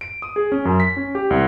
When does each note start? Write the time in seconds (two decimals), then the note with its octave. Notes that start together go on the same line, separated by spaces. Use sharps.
0.01 D7
0.22 D#6
0.36 G#4
0.52 C#4
0.65 F#2
0.80 B6
0.97 C#4
1.15 G4
1.30 C2